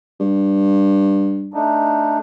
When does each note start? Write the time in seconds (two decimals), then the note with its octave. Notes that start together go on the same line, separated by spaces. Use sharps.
0.20 G2
1.54 A3 D4 D#4